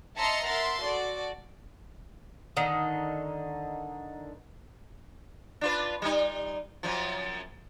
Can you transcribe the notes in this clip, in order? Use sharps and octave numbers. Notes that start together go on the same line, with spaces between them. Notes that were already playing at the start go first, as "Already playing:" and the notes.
D#5 E5 A5 A#5 C6 C#7
A#4 E5 F#5 C6 A6
F#4 A4 D5
D3 D#3 D#4
D4 F4 B4
G3 D#4
F#2 F3